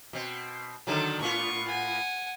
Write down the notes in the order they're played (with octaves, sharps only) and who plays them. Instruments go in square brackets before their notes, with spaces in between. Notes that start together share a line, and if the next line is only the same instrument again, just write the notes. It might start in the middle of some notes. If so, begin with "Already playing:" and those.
[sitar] B2 C4
[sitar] D3 D#3 F#3 [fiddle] A4
[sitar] A2 B3 F4 [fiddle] C#6
[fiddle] F#5 G#5